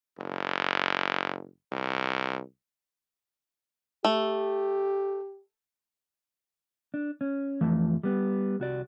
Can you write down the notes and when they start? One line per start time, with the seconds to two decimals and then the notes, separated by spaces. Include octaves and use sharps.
0.18 F#1
1.72 C2
4.04 A3 G4
6.94 D4
7.21 C#4
7.61 F2 E3 F3 A3
8.03 G3 B3
8.60 C2 F#4 D5